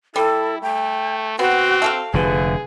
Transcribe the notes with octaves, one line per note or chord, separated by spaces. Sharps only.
G3 E4 A4
A3 G5
B3 C4 F#4
A3 A4 F5
F1 D3 G#4 B4